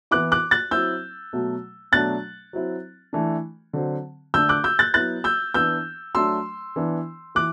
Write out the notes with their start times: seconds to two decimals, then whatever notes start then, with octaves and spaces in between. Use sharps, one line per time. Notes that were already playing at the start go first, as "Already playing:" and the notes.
0.11 E3 B3 E4 D6 F#6
0.32 D6 F#6
0.51 F#6 A6
0.71 F#3 C4 E4 E6 G6
1.33 B2 F#3 A3
1.92 B2 F#3 A3 D4 F#6 A6
2.53 F#3 C4 E4
3.13 E3 A3 D4
3.73 D3 F#3 C4
4.34 D3 A3 D4 E6 G6
4.49 D6 F#6
4.64 E6 G6
4.79 F#6 A6
4.94 F#3 B3 E4 F#6 A6
5.24 E6 G6
5.54 E3 B3 D4 E6 G6
6.15 F#3 A3 D4 C6 E6
6.76 E3 B3 D4
7.35 E3 D6 F#6